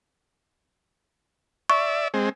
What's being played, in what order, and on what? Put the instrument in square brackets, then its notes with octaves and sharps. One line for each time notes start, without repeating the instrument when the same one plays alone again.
[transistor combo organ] D5 E5 [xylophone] C#6
[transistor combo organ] G#3 C4